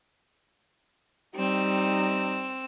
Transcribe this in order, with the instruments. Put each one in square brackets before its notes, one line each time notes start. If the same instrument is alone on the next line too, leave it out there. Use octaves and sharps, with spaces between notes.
[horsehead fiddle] G3 D#4 [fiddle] C4 E6